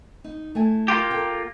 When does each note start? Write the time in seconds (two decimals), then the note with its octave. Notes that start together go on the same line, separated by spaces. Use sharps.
0.24 D#4
0.55 A3 E4 G#5
0.88 A#3 F4 G4
1.10 A4 A#4 G5